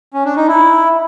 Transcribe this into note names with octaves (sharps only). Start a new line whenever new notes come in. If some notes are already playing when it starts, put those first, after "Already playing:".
C#4
D4
D#4
E4